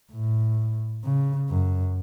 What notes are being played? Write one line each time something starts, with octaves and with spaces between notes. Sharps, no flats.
A2
C#3
F#2